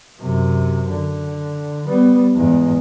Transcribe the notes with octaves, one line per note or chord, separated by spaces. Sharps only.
F#2 C3
D3
G3 B3
E2 G#2